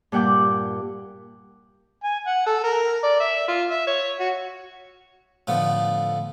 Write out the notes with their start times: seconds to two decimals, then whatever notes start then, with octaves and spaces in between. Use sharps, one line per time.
0.12 G2 A#2 F#5 G5 D6
2.04 G#5
2.26 F#5
2.46 A4
2.64 A#4
3.04 D5
3.20 E5
3.48 F4
3.70 E5
3.87 C#5
4.20 F#4
5.47 A2 D3 F3 B3